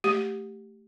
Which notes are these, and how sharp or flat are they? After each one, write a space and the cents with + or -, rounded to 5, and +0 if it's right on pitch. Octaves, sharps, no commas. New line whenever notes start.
A3 +0 G4 +0